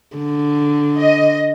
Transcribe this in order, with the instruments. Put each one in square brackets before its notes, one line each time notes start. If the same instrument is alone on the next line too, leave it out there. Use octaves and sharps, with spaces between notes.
[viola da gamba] D3
[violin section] D#5